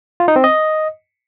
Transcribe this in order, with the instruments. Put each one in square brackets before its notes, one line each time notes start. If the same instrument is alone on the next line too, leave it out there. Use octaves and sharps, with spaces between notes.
[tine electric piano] F4
D#4
C4
D#5